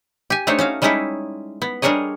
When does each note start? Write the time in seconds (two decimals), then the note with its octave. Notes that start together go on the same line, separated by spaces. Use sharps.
0.30 G4 G#5
0.47 A3 D4 D#4 C5 C#5
0.59 C#4 F#4 F5
0.82 G3 G#3 C#4 D#4 E4 A4
1.62 B3
1.82 G3 D4 G#4 A#4 C#5 D#5